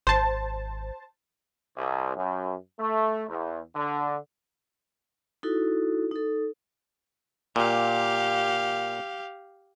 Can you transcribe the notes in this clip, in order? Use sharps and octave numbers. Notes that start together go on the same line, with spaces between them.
G#1 C5 A5
C2
F#2
A3
E2
D3
D#4 E4 F#4 A4
D#4 A4
A#2 G4 F5